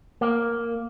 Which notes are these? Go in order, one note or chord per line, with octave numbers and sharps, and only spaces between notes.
A#3